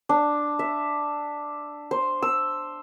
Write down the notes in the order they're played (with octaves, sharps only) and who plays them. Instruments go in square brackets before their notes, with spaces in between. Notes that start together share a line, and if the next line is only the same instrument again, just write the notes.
[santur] D4
E5
C5
E6